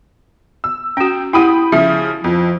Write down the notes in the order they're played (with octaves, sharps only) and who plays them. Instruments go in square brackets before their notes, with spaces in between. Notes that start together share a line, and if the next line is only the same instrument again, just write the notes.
[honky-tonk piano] E6
[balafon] C#4 F#4 [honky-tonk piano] G5
[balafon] E4 G4 F#5 [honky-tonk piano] G5 B5 D#6
[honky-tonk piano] C#3 F3 [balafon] E5
[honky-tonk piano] F2 [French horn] F3